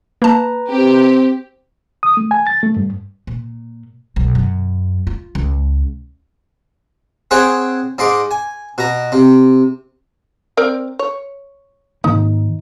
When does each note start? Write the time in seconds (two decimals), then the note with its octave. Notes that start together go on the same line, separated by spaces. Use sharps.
0.22 A#3 B4 A5 A#5
0.70 C4 G4
2.03 D#6
2.17 A3
2.31 G#5
2.47 A6
2.63 A3
2.77 G2
3.27 A#2
4.16 B1
4.35 F#2
5.07 F4
5.35 C#2
7.31 C4 G#4 C#5 F#5 G5
7.98 G#2 D#4 C6 D6
8.31 G#5
8.78 B2 A#5
9.12 C3
10.57 C4 A#4 D5
10.99 C#5
12.04 G#2 D#3 A#3 D#4